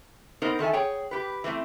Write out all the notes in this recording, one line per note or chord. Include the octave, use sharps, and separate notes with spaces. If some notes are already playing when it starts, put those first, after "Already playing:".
B3 C4 D#4 A#4 C5
D#3 A4 E5 G#5
G#4 C#5 G5
G4 B4
E3 A3 A#3 C4